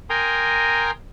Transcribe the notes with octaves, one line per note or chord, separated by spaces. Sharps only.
A#4 G5 G#5 A#5 C6 D#6